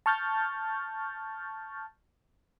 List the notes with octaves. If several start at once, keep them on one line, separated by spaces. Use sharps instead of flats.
A5 C#6 F6 G6 A6